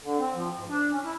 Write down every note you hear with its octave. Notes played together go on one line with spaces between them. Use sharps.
D3
C4
F3
G#2
D4
C#4
E4